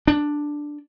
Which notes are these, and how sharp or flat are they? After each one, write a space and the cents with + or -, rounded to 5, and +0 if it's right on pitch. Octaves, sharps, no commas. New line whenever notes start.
D4 +5